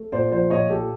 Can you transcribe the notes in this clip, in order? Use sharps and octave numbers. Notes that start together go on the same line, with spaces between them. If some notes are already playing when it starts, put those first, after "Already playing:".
Already playing: A3
A#2 C5 D5
F3 C5 D5
A#2 C#5 D#5
A3 G4 A4